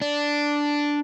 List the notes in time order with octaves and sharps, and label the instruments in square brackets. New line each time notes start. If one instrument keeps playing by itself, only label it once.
[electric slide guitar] D4